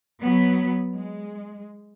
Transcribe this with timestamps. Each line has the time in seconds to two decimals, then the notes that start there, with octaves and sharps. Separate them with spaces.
0.21 F#3 B3
0.94 G#3